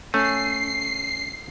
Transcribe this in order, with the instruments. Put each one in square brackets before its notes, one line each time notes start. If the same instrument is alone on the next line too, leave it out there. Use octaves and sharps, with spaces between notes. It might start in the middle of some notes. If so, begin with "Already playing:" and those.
[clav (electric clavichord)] A3 [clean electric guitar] C#4 [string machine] C7